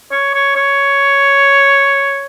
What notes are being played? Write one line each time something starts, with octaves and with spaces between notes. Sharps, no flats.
C#5
C#5
C#5